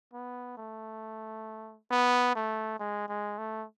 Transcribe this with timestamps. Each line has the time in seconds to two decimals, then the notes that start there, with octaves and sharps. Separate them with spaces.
0.13 B3
0.57 A3
1.91 B3
2.35 A3
2.79 G#3
3.09 G#3
3.38 A3